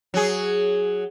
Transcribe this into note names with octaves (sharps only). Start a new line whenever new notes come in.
F#3 G#4